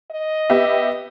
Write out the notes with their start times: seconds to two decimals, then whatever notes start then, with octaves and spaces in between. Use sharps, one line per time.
0.11 D#5
0.50 B3 G4 E5